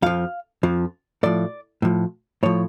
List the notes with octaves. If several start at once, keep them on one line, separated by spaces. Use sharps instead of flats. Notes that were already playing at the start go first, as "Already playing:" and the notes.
F2 F3 F5
F2 F3
A2 F3 D5
A2 F3
A2 F3 C#5